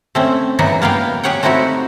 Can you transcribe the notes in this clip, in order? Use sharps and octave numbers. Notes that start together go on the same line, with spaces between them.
A3 C4 C#4
C#3 E3 F#3 B3 D#4
A#3 B3 F5 G5
G4 G#4 C#5 F#5 G5
A3 C4 D#4 E4 F#4 G4